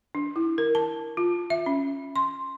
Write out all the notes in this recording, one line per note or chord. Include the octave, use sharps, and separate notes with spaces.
D4
E4
A#4
A5
F4
E5
C#4
C6